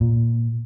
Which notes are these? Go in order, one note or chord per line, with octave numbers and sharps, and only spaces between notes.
A#2